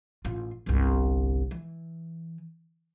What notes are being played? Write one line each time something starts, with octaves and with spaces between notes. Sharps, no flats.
A1 F4
G1 C2
E3